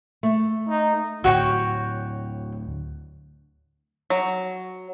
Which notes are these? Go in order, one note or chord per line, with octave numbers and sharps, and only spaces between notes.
A3
D#4
D2 A2 F#4 C#5 G5
F#3